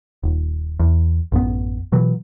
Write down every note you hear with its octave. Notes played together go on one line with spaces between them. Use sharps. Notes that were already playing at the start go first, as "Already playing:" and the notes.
D#1
E2
A1 F#2 B3
B2 E3 F#3